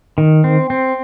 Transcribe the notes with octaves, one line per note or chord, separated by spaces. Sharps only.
D#3
C4
C4